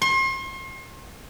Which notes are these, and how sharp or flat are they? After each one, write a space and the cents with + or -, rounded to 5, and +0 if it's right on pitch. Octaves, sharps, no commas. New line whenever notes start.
C6 +40